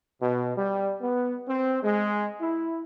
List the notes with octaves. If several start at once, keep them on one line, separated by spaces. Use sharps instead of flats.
B2
G3
B3
C4
G#3
E4